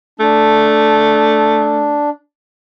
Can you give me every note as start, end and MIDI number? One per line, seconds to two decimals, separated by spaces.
0.20 2.06 57
0.20 2.10 62